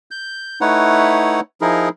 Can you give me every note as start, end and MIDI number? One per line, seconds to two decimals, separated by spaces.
0.11 0.59 91
0.61 1.40 57
0.61 1.40 63
0.61 1.40 64
0.61 1.40 71
0.61 1.40 73
0.61 1.40 78
1.61 1.89 53
1.61 1.89 63
1.61 1.89 64
1.61 1.89 68
1.61 1.89 70